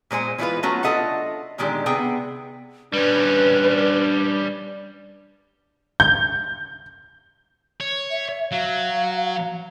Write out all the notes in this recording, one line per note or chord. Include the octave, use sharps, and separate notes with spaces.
A#2 G#3 C5 G#5
E3 G3 G#3 E4 F4 B4
F#3 A3 C#4 F4 F#4
D4 F4 A4 D#5 E5 F#5
A#2 D3 D#3 G#3 D4 G4
C3 B3 G#4 G5
G3 C#4 D4 B4
G6
C#5
E5
F#3 F5